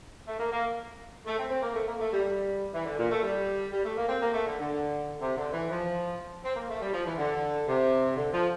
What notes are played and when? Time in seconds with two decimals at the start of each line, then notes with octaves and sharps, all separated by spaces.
0.27 A3
0.39 A#3
0.52 A#3
1.26 A3
1.39 C4
1.50 C4
1.62 A#3
1.75 A3
1.87 A#3
2.00 A3
2.12 G3
2.24 G3
2.74 E3
2.85 D3
2.98 A#2
3.11 A3
3.23 G3
3.73 G3
3.85 A3
3.97 A#3
4.09 C4
4.22 A#3
4.34 A3
4.46 D3
4.59 D3
5.20 C3
5.37 D3
5.53 E3
5.70 F3
6.44 C4
6.56 A#3
6.69 A3
6.81 G3
6.93 F3
7.06 E3
7.18 D3
7.68 C3
8.17 D3
8.33 F3